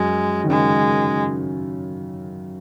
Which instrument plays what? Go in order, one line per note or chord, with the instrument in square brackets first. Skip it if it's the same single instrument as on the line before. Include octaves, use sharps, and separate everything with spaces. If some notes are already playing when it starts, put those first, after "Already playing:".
Already playing: [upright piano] F#2 [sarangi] G#3
[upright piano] D#3
[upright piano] C#3 [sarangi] G#3